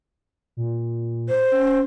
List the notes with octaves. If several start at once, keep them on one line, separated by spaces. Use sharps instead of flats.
A#2
C5
C#4